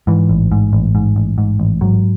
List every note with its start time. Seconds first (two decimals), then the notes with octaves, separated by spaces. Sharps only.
0.07 G#2 E3
0.29 A1
0.52 G#2
0.73 A1
0.95 G#2
1.16 A1
1.38 G#2
1.60 A1
1.81 G#2 F#3